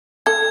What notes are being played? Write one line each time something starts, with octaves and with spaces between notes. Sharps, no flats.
A4 G#6